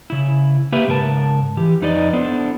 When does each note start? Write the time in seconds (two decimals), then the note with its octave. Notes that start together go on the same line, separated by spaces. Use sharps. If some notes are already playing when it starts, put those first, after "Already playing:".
0.10 C#3 E4
0.72 A#3 G4 B4 E5
0.88 G#2 C#3 A#4 A5
1.57 E3 G4
1.81 F2 D#4 B4 D5 D#5
2.13 B3 D4 E4 A4 C5